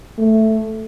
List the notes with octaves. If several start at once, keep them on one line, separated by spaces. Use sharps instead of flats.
A3